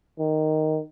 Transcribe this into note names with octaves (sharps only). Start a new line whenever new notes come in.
D#3